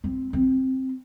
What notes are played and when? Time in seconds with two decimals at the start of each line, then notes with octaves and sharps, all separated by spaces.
0.04 C4
0.33 C4